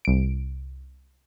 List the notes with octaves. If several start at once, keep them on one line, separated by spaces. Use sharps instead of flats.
C2 D7